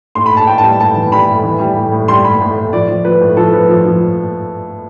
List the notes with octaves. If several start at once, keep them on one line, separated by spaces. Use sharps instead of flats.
A2 C6
B5
A2
A5
A2 G5
A5
G3
A2 A5
E3
G3 B5
A2
E3
G3
A2
A2
G3 C6
G3 B5
A2
A2
F3 D5
F3
F3 B4
A2
F3 A4
F3 B4
F3
F3